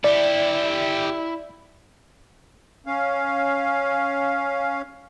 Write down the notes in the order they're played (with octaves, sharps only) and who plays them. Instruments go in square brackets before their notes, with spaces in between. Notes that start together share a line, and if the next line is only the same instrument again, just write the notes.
[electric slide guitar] E4 [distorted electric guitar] G4 A4 [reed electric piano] D5
[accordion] C#4 F5